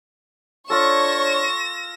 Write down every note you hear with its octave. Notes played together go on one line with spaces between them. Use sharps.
D4 F4 A4 C#5 C#6 A#6 E7